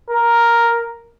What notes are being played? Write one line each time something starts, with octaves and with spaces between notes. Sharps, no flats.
A#4